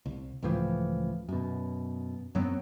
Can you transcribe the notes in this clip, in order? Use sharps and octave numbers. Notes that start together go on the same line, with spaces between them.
C2
C#2 A2 E3 F3
F#2 B2
F#2 F#3 B3 C4